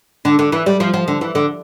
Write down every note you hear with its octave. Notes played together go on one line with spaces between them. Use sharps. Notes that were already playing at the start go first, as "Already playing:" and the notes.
D3
D3
E3
G3
F3
F3
D3
E3
D3